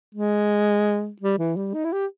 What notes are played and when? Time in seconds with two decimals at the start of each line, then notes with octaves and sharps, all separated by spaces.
0.15 G#3
1.22 G3
1.39 E3
1.57 G3
1.74 D#4
1.85 E4
1.93 G4